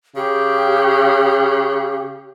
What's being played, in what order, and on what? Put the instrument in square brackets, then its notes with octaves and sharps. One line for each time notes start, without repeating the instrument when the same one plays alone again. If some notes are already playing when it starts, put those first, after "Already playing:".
[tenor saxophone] C#3 [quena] G4